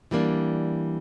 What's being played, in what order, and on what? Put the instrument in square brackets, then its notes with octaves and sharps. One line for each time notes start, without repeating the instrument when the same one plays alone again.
[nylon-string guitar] E3 G3 A#3 D4